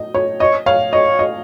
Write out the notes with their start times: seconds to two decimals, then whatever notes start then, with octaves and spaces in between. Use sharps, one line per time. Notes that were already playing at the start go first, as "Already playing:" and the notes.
Already playing: D#5
0.14 C#5
0.40 C#5 D#5
0.66 C#5 F5
0.93 C#5 D#5
1.19 D#5